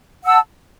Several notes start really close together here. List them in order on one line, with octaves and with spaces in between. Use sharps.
F#5 E6 A5